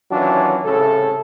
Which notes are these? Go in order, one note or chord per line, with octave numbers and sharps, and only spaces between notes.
D#3 E3 F#3 C#4 D4 F4
C2 A2 C#3 A4